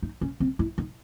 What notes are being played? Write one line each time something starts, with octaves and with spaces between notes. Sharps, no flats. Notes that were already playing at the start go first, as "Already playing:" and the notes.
D#4
C#4
C4
E4
D#4